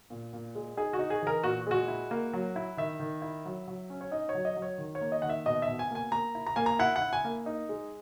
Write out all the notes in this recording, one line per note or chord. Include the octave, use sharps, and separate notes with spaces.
A#2
A#2
G#3
D#4 G#4
F#4
D#4
G#4
E3 A#4
A#2 F#4
G#3 F#4
E4
A#3
F#3
E4
D#3 E5
D#3
E4
F#3
F#3
C#4
C#5
D#4 D#5
C#5
F#3
D#5
F#3
C#5
D#3
C#5
A#3
D#5
D#3 F#5
E5
B2 D#5
E5
B2
G#5
A#3 G#5
A#3 A#5
E4
A#5
A#3 G#5
A#5
E4 F#5
F#5
E4
G#5
A#3
D#4
G#3